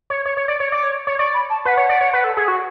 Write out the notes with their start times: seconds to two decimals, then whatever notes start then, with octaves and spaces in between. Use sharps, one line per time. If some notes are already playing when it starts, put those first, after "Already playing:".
0.10 C#5
0.26 C#5
0.37 C#5
0.48 D5
0.60 C#5
0.72 D5 D6
0.83 C#5
1.07 C#5
1.19 D5 C#6
1.34 B5
1.50 A5
1.65 B4 F#5
1.77 C#5
1.89 D5
2.00 C#5
2.13 B4
2.24 A4
2.37 G#4
2.48 F#4